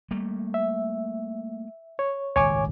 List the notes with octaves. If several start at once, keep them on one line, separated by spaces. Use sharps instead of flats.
G3 A3 A#3
E5
C#5
D#1 G#1 C#2 C#5 G#5 D6